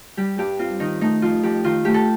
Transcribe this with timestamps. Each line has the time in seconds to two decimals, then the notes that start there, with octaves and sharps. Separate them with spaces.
0.17 G3 G4
0.38 G2 G4
0.59 C4 F4
0.80 D#3 D#4
1.01 A3 D#4
1.22 F2 F4
1.43 F2 G4
1.64 D#3 F4
1.85 A3 G4
1.94 A4